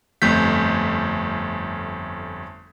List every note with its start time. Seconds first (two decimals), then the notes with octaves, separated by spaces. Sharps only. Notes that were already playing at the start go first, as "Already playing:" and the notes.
0.22 G1 F2 A3 G6 B6